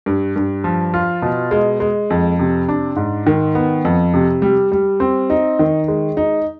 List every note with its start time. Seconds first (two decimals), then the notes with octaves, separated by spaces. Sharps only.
0.06 G2
0.36 G2
0.64 F3
0.94 F4
1.22 B2
1.51 G#3
1.80 G#3
2.10 F2
2.39 C3
2.69 D4
2.96 G#2
3.27 D#3
3.55 B3
3.85 F2
4.14 C3
4.42 G3
4.72 G3
5.00 C4
5.30 D#4
5.59 D#3
5.88 G#3
6.17 D#4